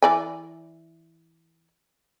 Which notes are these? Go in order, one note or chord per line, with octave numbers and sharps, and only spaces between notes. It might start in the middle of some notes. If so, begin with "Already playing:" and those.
E3 D5 G#5